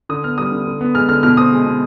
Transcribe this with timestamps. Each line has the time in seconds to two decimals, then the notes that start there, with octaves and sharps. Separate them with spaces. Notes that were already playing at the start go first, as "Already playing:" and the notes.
0.09 D3 D#6
0.24 B3 F6
0.38 G3 D#6
0.52 D3
0.67 D3
0.81 B3
0.95 G#3 F6
1.09 D3 F6
1.23 B2 F6
1.37 C4 D#6
1.52 G#3
1.66 B2